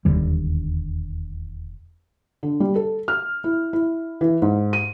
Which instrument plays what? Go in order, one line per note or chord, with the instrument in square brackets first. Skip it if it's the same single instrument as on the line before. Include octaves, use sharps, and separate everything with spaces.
[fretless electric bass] E1 D#2 D3 G3
[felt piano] D3
G3
A4
F6
E4
E4
E3
G#2
D#7